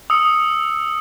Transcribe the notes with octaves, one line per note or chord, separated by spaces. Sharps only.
D#6 E6 C#7